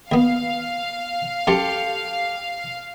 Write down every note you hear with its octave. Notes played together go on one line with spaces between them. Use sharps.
D#2 B3 F5
F#2 G4 A4 C6